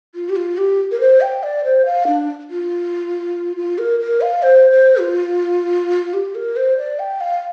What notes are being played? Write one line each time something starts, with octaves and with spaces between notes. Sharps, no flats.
F4
G4
F4
G4
A#4
C5
G5
D5
C5
F5
D4
F4
F4
A#4
A#4
F5
C5
C5
F4
G4
A#4
C5
D5
G5
F5